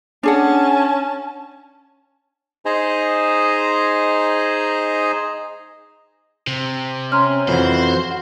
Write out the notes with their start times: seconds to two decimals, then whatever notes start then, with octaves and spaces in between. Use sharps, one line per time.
0.23 C#4 D4 G#4 F#5 A5
2.65 D#4 G#4 C5 D#5 G#5 A#5
6.47 C3
7.12 C#4 A#5 C6 F6
7.48 F2 E3 F#4 C5